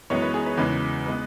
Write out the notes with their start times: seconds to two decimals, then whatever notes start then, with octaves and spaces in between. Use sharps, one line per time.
0.10 F#2 E3 G#3 B3 C#5
0.22 B4
0.34 G#4
0.46 B4
0.57 E2 C#3 G#3 B4
1.06 G#3 B3 B4